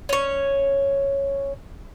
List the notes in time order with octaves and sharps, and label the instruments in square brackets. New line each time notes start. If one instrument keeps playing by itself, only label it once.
[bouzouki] C#4 C#5